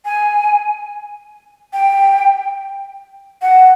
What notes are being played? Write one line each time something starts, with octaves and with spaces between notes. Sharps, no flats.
G#5
G5
F#5